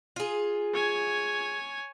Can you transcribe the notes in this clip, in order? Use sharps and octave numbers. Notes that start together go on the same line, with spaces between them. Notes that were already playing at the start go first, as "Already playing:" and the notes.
F4 G#4
C#5 G#5